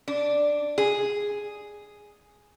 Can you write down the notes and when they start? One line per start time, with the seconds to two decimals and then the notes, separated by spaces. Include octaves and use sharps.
0.08 D4
0.78 G#4